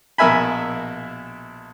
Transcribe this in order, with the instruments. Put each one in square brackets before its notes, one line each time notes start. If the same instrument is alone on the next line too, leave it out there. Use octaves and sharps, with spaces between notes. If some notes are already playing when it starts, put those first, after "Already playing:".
[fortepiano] A#1 B2 A#4 E5 G#5 B5